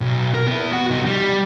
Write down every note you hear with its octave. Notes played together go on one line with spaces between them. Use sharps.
B1
A#4
B3 E4
F#4 F#5
C2 D#4
G3